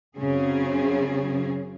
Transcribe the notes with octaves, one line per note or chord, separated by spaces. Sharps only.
F#2 C#3 C4 C#4 G#4